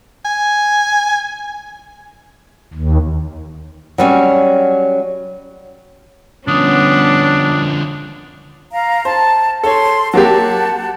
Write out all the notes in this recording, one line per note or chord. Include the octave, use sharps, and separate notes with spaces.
G#5
D#2
F#3 G3 C#4
D3 F3 G3 B3 C#4 D4 D#6
F5 A#5
C5 A5
A4 C#5 C6
F#3 A#3 G4 F#5 A5